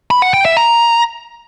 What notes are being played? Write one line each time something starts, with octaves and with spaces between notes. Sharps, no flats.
B5
F#5
G5
E5
A#5